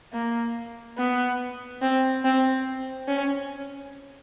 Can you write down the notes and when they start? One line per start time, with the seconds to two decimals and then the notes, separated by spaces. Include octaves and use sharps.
0.13 A#3
0.97 B3
1.82 C4
2.24 C4
3.08 C#4